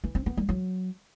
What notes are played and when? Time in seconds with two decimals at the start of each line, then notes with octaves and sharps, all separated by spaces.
0.04 E3
0.15 C4
0.26 B3
0.37 G3
0.49 F#3